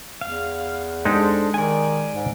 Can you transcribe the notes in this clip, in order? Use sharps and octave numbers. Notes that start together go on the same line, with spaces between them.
E2 F5
G#3 D4 D#4 G4 A4 C5
D#3 D5 G#5
G#2